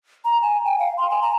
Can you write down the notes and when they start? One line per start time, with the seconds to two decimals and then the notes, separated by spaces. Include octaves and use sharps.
0.25 A#5
0.42 G#5
0.65 G5
0.79 F5
0.98 C6
1.10 G#5
1.22 A#5